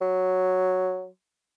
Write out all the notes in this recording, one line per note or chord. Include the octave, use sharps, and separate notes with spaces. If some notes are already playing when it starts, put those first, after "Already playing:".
F#3